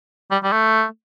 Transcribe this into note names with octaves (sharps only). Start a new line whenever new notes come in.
G3
G3
A3